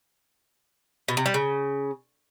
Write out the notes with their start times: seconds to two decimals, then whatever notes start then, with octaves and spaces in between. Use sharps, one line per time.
1.08 B2
1.17 C3
1.26 G3
1.34 C#3